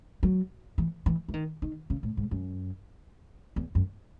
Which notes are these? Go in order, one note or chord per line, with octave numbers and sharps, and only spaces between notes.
F#3
E3
E3
E3
D#3
D#3
C#3
A2
G#2
F#2
E2
F#2